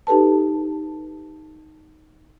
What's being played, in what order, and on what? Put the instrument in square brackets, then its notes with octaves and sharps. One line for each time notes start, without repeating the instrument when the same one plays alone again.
[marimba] D#4 G4 A4 B4 A5